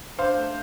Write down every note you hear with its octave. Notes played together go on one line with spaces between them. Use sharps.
D4 C5 F5
A3